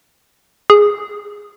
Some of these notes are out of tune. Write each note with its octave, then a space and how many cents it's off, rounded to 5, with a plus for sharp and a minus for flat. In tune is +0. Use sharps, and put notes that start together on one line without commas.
G#4 -5